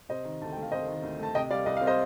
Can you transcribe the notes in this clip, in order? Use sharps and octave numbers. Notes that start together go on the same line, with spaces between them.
C3 C5 D#5
D#3
D2 A5
A3 G5
F5
C3 C5 D#5
D#3
D2
A3 A5
C3 D#5 G5
G3 D5 F5
C2 D#5
C4 F5
C5 D#5